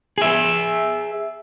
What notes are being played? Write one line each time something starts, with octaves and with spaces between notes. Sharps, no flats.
G#4 E5